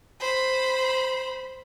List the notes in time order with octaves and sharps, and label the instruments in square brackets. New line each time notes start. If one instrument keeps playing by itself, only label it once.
[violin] C5 B5